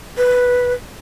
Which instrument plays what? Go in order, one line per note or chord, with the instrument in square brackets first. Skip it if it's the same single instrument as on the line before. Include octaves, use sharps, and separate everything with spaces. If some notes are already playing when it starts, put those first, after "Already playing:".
[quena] B4